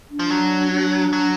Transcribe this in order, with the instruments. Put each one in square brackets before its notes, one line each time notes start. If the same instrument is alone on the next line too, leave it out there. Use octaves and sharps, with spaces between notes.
[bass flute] D4
[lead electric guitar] F3
F#3
[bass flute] D4
[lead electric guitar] F#3